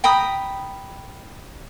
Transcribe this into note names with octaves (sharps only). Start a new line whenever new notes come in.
G5 A#5 B5 D#6